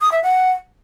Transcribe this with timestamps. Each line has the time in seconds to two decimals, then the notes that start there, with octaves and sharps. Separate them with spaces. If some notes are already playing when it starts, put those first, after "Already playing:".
0.01 D#6
0.12 E5
0.23 F#5